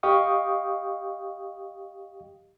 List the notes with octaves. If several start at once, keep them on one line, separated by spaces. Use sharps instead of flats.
G4 D#5 F5 G5 C#6 D#6